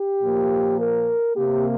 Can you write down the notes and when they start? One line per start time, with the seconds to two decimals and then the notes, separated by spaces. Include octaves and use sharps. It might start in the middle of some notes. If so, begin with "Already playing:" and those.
Already playing: G4
0.22 A#2 F3 A#3
0.80 A#4
1.36 C3 A#3 G4